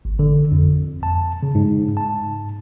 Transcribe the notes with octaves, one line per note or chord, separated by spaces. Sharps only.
G#1
D3
F2
A5
C#3
G#2
A5